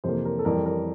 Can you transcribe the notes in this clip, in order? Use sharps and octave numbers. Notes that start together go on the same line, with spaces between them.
F2 C3 E3 A#3 C5
A#4
A4
F2 E3 G3 A#4
A#4